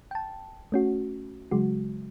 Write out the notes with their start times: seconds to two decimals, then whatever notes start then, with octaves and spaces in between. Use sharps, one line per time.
0.11 G5 A5
0.72 A3 C#4 F#4
1.51 C#3 F#3 G#3 F#4